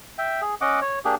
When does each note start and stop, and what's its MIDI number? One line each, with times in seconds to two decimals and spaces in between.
0.18 0.41 76
0.18 0.41 79
0.41 0.55 68
0.61 0.80 61
0.61 0.80 75
0.61 0.80 78
0.61 0.80 86
0.82 0.99 73
1.05 1.15 58
1.05 1.15 62
1.05 1.15 67
1.05 1.15 68